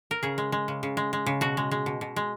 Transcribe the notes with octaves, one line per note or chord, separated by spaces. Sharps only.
A#4
C#3 G#4
G#3
G#3
C#3
C#3
G#3
G#3
C#3
B2 F#4
G#3
G#3
B2
B2
G#3